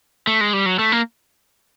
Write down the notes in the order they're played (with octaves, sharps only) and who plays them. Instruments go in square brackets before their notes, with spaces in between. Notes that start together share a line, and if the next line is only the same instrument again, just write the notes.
[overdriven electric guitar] A3
G#3
G3
F#3
A3
A#3